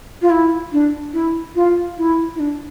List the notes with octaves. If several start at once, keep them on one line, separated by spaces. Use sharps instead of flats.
F4
E4
D4
E4
F4
E4
E4
D4